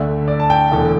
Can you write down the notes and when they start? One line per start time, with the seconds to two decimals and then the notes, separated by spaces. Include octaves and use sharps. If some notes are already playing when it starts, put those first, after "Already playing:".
Already playing: D2 D3 A3 D4 E5
0.28 D5
0.40 A5
0.50 G5
0.71 E1 E2 D3 A3